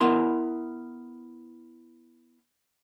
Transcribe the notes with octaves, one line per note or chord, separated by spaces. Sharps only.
B3 E4 A#4 C6